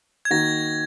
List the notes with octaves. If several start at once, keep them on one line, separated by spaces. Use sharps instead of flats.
G#6
D#3 A#3 D#4 F#4 A#6